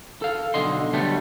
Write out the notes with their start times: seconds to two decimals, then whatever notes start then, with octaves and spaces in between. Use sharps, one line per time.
0.22 A4 F5
0.54 B1 D3 D#5 C6
0.93 D3 F#3 G3 A3 B3